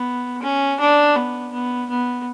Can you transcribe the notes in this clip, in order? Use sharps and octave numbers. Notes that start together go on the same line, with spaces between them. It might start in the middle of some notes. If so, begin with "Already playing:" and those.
Already playing: B3
C#4
D4
B3
B3
B3